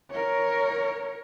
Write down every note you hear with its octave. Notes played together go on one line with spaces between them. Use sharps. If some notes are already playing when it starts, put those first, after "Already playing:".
A#4 C#5